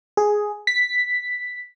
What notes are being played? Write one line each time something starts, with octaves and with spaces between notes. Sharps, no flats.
G#4
B6